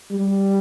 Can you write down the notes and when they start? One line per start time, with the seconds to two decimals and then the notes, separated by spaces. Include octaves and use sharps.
0.12 G3